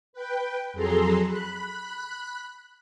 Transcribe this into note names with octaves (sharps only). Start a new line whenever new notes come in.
B4 G5
F2 F#3 G#4 A4 A#5 C6
B5 F#6